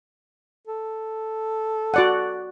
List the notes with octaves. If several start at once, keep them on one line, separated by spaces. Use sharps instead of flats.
A4
F#4 D5 F#5